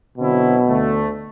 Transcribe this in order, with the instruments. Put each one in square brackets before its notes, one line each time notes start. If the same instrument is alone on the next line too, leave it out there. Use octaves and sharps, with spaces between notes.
[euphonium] B2 [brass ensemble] D3 F#3 C4 E4
[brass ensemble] D2 D3 A3